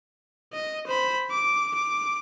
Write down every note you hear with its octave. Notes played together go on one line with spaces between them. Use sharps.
D#5
C5 B5
D6
D6